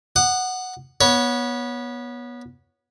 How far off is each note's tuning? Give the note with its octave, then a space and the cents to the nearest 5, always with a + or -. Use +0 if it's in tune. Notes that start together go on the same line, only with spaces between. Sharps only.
F#5 +0 D#6 -35
B3 -20 C#5 +10